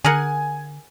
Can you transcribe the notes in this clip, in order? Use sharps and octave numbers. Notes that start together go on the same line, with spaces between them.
D3 G#4 A#4 F#5 G#5